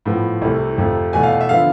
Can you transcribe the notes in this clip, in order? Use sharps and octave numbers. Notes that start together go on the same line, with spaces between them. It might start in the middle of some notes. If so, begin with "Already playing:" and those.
A2 F3 B3
C2 C3 E3 A3
F2 C3 F3 A3
E2 B2 A3 G#5
F5
E5
D3 F3 B3 F5